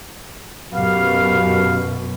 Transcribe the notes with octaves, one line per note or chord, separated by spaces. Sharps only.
F#2 B2 B3 G4 F5